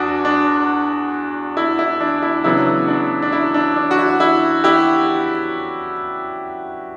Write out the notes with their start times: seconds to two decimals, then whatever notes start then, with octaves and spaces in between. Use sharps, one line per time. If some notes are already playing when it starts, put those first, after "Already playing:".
Already playing: E2 D4 F#4
0.25 D4
1.57 E4
1.79 E4
2.01 D4
2.22 E4
2.44 C#3 F#3 B3 D4 E4
2.88 D4
3.22 D4
3.32 E4
3.54 D4
3.76 D4
3.91 F#4
3.98 E4
4.20 E4
4.64 E4 G4